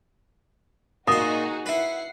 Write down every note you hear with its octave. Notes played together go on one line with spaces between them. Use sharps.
A#2 D#4 F#4 G#4 C6 D#6
E4 B4 F#5 C7